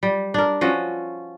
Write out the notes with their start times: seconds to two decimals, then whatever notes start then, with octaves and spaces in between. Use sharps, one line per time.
0.03 G3
0.34 D4 A#4
0.61 F3 C#4 F#4